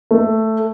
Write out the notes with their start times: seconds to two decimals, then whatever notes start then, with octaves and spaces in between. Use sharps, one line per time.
0.11 A3